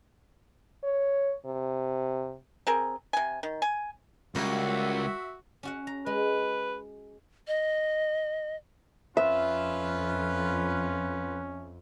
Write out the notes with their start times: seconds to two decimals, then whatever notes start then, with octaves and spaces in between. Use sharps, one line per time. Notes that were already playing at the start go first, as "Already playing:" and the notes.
0.84 C#5
1.45 C3
2.67 C4 G#4 A#4
3.13 C3 G#5
3.43 D#3
3.62 G#5
4.35 C#2 G3 A#3 F4 F#4 E5
5.63 C#4 F#4 F#5
5.87 A#5
6.06 G#3 B4
7.47 D#5
9.17 F2 C#4 F4 B4 E5